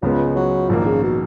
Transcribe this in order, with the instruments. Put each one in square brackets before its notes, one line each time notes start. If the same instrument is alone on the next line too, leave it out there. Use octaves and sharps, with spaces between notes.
[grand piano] C#2 C#3 G#3 B3 [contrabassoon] F3
[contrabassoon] F#3
[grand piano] A#1 G#2 D#3 A#3 [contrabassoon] F3
[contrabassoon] C#3
B2